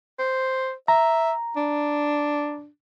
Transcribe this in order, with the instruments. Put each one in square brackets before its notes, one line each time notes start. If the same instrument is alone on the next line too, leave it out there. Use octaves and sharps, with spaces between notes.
[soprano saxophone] C5
[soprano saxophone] E5 [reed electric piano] A#5
[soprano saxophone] D4